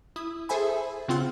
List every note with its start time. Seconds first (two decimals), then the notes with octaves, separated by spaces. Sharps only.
0.16 E4 D#6
0.49 G#4 A4 C5 E5 G#5 B5
1.08 C#3 C4 F4 F#5